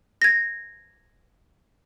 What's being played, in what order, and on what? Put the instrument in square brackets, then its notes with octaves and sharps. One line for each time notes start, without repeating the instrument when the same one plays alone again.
[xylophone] G#6 A#6